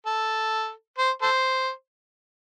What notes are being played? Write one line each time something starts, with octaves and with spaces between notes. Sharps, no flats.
A4
C5
A4 C5